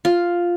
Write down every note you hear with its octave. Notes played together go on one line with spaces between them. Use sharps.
F4